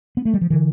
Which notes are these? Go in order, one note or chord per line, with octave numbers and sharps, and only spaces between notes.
B3
A3
G3
F3
D3 E3